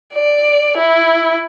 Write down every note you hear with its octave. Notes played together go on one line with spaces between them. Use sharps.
D5
E4